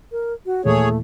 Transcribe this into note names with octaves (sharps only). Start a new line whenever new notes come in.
A#4
F#4
D#2 A#2 E3 A3 G#4 C#5